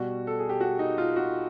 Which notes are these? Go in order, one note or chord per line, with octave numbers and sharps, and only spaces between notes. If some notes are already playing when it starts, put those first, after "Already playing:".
Already playing: B2 G3 F#4
A4
G#4
G4
F#4
D#4
F4
F#4